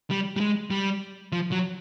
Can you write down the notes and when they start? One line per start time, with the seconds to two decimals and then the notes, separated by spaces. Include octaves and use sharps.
0.10 G3
0.37 G3
0.41 G#3
0.71 G3
1.32 F3
1.52 F#3